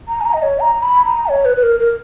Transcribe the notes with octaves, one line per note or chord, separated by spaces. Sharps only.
A#5
G#5
A#5
D#5
C#5
A#5
B5
A#5
C#5
B4
B4
A#4
A#4